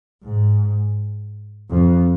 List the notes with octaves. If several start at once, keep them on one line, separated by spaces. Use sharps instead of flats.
G#2
F2